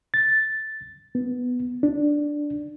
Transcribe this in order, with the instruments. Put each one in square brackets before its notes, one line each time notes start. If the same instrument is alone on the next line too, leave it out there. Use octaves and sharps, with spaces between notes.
[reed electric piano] A6
B3
D4